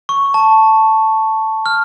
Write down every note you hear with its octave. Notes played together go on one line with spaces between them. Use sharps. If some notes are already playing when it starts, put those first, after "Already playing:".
C#6
A5
F6